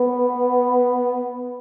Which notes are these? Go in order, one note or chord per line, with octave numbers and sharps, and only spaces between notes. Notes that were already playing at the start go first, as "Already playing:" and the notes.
Already playing: B3